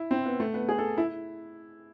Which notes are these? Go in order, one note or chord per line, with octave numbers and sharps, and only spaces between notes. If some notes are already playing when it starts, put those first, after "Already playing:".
Already playing: E4
C4
B3
A3
B3
G#4
A4
E4